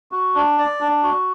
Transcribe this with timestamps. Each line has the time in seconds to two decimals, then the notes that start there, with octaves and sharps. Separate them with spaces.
0.12 F#4
0.35 D4
0.58 D5
0.81 D4
1.03 F#4